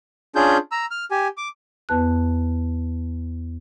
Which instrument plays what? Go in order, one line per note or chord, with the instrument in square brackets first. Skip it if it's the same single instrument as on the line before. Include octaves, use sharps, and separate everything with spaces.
[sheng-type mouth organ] C#4 D4 F4 G#4 G6
A#5 E6
F6
G4 G#5
D6
[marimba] E2 B3 B4 A5 F#6